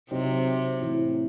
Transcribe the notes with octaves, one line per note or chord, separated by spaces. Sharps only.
C3 F#3 C4 D#4
A2 E3 C4